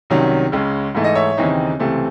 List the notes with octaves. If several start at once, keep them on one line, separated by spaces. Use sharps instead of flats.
C2 C3 D#3 F#3 C#4
C#2 C#3 G#3
G#2 E3 A3 D#4
D#5
C#5 E5
D#2 C#3 E3 C4 D#4
C#2 C3 E3 A3 C4